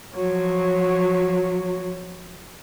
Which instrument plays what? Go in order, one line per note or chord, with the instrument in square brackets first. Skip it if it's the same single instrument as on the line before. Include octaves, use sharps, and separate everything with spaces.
[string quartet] F3 F#3 C#5